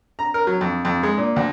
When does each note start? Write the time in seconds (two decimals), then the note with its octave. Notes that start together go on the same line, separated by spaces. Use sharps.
0.19 A#5
0.34 A#4
0.47 F#3
0.61 F2
0.85 F2
1.03 G#3
1.18 A#2
1.36 D2